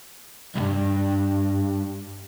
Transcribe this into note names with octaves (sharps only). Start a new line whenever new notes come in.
B1 G2